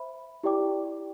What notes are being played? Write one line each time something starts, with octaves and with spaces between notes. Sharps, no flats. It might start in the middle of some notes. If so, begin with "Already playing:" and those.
Already playing: C5 E5 B5
E4 G4 D5 G5 D6